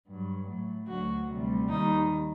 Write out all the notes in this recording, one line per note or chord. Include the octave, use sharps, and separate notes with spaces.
G2 F#3
A2 F#3
D2 D3 F#3 F#4
D2 C3 G3
D#2 D#3 G3 D#4